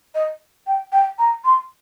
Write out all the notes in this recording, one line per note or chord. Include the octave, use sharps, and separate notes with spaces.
D#5
G5
G5
A#5
C6